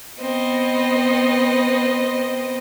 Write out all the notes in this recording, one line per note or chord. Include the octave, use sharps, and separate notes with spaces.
B3 C4 D#5